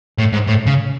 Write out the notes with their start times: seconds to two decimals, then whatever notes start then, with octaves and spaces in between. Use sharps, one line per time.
0.18 A2
0.33 G#2
0.48 A2
0.66 C#3